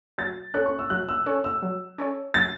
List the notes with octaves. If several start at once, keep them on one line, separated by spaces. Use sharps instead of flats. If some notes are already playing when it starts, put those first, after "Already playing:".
F#3 A6
C#4 A4 C#5 F#6
C#6
E6
F#3 F#6
E6
C#4 A4 C#5
E6
F#3
C#4 A4 C#5
F#3 A6